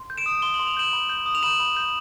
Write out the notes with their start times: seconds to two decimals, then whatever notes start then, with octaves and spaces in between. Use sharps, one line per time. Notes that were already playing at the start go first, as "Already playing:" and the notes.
Already playing: C6
0.10 G6
0.18 D7 E7
0.26 D#6
0.42 C6 G7
0.54 F#7
0.59 C6
0.67 F7
0.77 G6 E7 F#7
0.93 B5
1.09 G6
1.26 D#6
1.35 F7
1.43 B5 E7 F#7
1.60 B5
1.76 G6